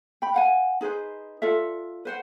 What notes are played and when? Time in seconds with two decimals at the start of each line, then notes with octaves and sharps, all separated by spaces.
0.22 G5 B5
0.34 F5 F#5 G#5
0.81 D#4 G#4 B4 C5
1.42 F4 A4 D5 E5
2.05 B4 C5 F#5